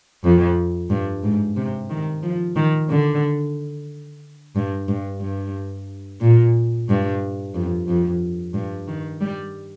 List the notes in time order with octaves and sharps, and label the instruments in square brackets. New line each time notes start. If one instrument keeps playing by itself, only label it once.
[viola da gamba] F2
G2
G#2
C3
D#3
F3
D#3
D3
G2
G2
G2
A#2
G2
F2
F2
G2
D#3
G3